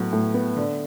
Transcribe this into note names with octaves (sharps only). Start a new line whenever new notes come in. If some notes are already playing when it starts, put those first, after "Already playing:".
Already playing: A2 F#3 B3
A2
B3
D3